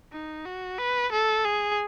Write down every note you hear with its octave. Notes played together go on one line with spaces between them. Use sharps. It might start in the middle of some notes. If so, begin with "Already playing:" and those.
D#4
F#4
B4
A4
G#4